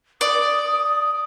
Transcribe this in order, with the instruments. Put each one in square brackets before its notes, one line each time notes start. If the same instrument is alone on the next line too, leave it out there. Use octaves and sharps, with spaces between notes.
[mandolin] D5 [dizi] D#6